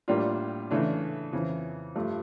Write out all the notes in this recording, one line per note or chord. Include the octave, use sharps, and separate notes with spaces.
A2 G3 A#3 D4 F4
C#3 E3 A3 D4
F2 C#3 E3
G2 F3 A3